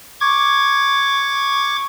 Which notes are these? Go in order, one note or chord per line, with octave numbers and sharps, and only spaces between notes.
C#6 D6 G#6